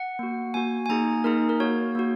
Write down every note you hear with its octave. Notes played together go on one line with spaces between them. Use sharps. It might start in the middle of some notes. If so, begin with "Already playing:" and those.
Already playing: F#5
A#3 F#4
A#3 F#4 G#5
G#5
A#3 D#4 G#4 A#5
A#3 D#4 G#4 A#4
A#4
A#3 F#4 C#5
A#3 F#4